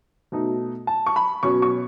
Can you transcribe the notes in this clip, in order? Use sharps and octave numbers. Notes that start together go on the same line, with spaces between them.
B2 A3 D#4
A5
C#6
B5
B2 F#3 C#4 C#6
C#6